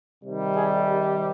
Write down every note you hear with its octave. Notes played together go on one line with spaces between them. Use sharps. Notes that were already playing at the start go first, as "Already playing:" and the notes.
C3 D#3 G3
G#4
G4